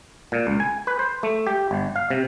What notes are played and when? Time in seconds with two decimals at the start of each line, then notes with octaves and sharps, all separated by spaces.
0.32 A#2
0.47 C#2
0.60 G#5
0.87 B4
0.99 C5
1.23 A3
1.47 G4
1.71 G1
1.96 F5
2.10 C3